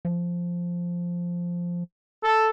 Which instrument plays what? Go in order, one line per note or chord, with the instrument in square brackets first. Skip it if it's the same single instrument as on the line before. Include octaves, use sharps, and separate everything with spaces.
[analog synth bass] F3
[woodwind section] A4